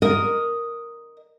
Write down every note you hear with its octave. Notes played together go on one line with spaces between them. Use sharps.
A#4 D#5